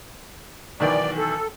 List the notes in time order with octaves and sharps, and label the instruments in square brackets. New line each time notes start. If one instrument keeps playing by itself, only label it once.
[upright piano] B1 D#3 E3 [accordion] D5
[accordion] A4